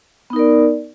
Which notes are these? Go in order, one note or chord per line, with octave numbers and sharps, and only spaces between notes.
B3 D#4 A#4 D5